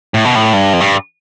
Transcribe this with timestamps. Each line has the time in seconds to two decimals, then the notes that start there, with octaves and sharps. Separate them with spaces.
0.14 A2
0.25 B2
0.35 A2
0.53 G2
0.73 F2
0.80 G2